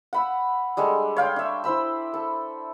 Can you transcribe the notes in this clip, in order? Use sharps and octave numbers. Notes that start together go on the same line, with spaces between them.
F#5 B5 E6
G3 G#3 D4 A4
C#5 F5 G5 C6
D4 E5
E4 C5 B5 E6
A4